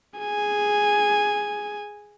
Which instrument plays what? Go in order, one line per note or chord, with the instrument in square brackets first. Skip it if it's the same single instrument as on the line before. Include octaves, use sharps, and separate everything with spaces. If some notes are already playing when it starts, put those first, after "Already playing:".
[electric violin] G#4 G#5